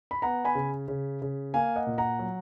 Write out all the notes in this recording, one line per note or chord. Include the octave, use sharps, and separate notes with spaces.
B5
B3 F#5 A#5
G#5 B5
C#3
C#3
C#3
A#3 F5 G#5
D#5 F#5
A#2
F#5 A#5
F#3